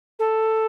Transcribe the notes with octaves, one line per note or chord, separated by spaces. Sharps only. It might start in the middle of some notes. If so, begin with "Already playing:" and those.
A4